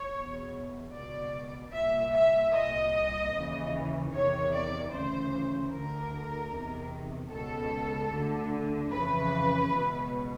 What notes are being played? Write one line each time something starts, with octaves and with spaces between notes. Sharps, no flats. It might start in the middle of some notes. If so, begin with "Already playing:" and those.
Already playing: C#5
E2 B2
C#2 B2 D5
C2 A#2 E5
E5
C2 A#2 D#5
D#2 C#3 E3
E2 C3 D#3 C#5
D5
D2 C#3 E3 C5
D2 D3 A#4
E2 C3 D#3
C#2 B2 A4
D2 D3
F2 C#3 E3 B4
C#2 B2